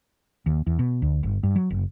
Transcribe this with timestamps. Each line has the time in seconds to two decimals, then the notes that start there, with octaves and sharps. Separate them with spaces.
0.46 D#2
0.67 E2
0.79 B2
1.02 D2
1.23 G1
1.43 G2
1.56 F#3
1.70 F#1